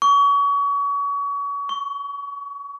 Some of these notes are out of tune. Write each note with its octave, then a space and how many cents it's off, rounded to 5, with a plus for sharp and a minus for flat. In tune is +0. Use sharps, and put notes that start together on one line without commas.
C#6 +35
C#6 +0